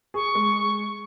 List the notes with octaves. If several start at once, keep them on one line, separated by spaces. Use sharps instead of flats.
G#4 C#6
G#3